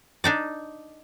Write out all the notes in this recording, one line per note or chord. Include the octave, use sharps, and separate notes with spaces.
D4 D#4 D5